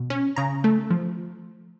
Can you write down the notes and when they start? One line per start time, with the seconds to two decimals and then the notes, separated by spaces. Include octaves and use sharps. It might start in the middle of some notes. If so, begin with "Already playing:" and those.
Already playing: B2
0.10 C#4
0.36 C#3 A#5
0.64 A3
0.90 F3